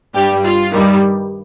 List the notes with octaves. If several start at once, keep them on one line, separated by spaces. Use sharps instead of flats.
G2 G3 G4
F4
G2 D#3 G3